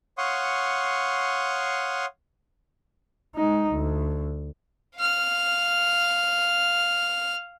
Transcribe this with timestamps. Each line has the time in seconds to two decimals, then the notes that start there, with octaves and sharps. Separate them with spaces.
0.18 C#5 F5 F#5 C6 C#6 D#6
3.35 G#3 D#4
3.72 D2
4.96 F5 F6